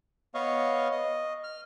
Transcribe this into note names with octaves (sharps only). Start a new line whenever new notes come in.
B3 C#5 D#5 F5
D#5
F6